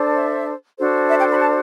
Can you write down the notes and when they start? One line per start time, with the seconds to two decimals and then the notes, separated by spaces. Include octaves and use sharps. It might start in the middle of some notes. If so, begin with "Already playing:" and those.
Already playing: D4 A4 C5
0.15 E5
0.78 D4 F#4 A4 C5
1.10 E5
1.19 G5
1.30 B5
1.40 A5